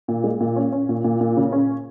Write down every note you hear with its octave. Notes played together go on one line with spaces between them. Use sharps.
A#2
G#3
A#2
C#4
C#4
A#2
A#2
A#2
C#3
C#4